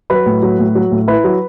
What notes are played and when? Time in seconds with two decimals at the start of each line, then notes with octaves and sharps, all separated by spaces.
0.10 F#3 B4 B5
0.26 A2
0.42 F#3
0.59 A2
0.75 F#3
0.92 A2
1.08 E4 B4 B5
1.24 F#3